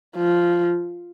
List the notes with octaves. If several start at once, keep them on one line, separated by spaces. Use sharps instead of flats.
F3